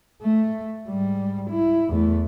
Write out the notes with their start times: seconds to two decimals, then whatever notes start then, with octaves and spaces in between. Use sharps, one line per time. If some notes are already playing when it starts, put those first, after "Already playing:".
0.22 A3
0.88 G#2 G3
1.50 E4
1.88 E2 A3